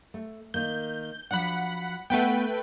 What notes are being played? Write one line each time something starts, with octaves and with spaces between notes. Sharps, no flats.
A3
D#3 A#3 G6
F3 F#3 D4 F#5 B5
A3 B3 B4 F#5 G5 A5